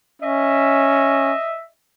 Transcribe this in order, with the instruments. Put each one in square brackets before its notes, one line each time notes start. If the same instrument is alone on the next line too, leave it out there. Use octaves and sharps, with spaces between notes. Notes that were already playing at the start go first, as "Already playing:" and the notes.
[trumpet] C#4 [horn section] D#5 E5